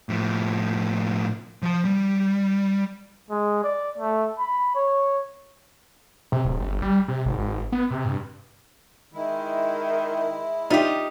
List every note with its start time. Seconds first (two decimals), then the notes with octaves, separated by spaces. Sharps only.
0.09 A2 F3
1.62 F3 A5
1.85 G3
3.30 G#3
3.64 D5
3.98 A3
4.39 B5
4.75 C#5
6.32 C3
6.45 D1
6.61 G1
6.82 G3
7.08 C3
7.26 G#1
7.38 G#1
7.72 B3
7.91 C3
8.05 G2
9.14 D#3 G#3 E4
10.70 D4 D#4 F4 G4 E5